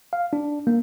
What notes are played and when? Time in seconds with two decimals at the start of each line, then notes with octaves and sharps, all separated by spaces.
0.13 F5
0.33 D4
0.67 A#3